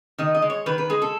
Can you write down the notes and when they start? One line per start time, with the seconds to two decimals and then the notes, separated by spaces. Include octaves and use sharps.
0.18 D#3 D#5
0.34 D#5
0.42 G#3
0.50 C#5
0.66 D#3 B4
0.78 B4
0.90 G#3 G#4
1.02 A4